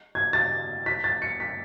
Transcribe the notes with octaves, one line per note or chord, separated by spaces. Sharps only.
G#6
A6
B6
A6
C#7
B6